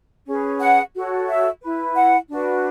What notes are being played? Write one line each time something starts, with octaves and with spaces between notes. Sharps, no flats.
C#4 G#4 B4
F#5
F#4 A4 C#5
E5
E4 B4
F#5
D4 F#4 B4